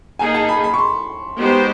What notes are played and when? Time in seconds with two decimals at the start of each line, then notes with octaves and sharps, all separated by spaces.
0.19 A#3 D#4 G#4 G#5
0.34 A5
0.49 B5
0.64 B5
0.74 C#6
0.78 C6
1.38 G#3 B3 D#4 G4 C5